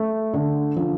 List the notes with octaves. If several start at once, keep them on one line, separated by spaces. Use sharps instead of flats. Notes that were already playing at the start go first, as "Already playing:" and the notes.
Already playing: A3
D3
F3